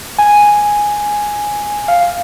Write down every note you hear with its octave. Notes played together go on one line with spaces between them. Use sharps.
G#5
F5